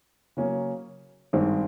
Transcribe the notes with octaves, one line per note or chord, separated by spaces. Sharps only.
C#3 F#3 A#3 C#4
G#1 G2 D#3 G#3 C4